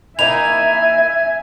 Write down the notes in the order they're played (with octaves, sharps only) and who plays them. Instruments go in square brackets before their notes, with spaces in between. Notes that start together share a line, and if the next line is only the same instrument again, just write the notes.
[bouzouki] A#3 D#4 E4 [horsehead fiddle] E5 [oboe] G#5 [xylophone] F7